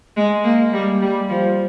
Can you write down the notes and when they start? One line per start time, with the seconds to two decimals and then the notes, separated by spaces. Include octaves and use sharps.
0.17 G#3
0.44 A#3
0.73 G3
1.02 G3
1.29 F3